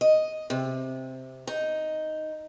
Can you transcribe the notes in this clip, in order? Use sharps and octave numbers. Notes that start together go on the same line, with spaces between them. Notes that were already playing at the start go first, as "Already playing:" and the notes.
D#5
C3
D#4